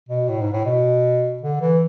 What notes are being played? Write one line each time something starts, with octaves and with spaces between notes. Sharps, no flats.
B2
A2
G#2
A2
B2
D3
E3